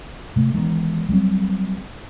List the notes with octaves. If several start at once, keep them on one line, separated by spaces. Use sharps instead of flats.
C3 A3
D#3 E3 G#3 B3
F#3 G3 A#3 C4